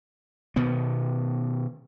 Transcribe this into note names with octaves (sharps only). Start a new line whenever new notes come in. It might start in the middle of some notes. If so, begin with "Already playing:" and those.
B2 D#3 B3